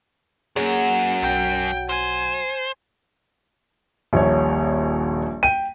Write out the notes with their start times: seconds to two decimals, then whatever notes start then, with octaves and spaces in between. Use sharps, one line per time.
0.56 F#2 F#3 A#3 C#4 G#4
1.22 B1 F#5 G5
1.89 C5 G#5
4.13 D#1 A#1 C#5
5.43 G5 D#7